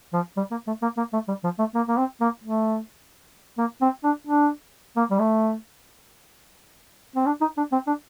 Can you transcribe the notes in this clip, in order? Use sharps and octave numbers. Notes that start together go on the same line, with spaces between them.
F3
G3
A#3
A3
A#3
A#3
A3
G3
F3
A3
A#3
A#3
C4
A#3
A3
A#3
C4
D4
D4
A#3
G3
A3
C4
D4
D#4
D4
C4
D4